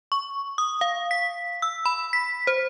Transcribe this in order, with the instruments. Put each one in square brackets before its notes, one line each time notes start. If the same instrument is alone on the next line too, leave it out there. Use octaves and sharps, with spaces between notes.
[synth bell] C#6
D#6
F5
B6
E6
B5
B6
C5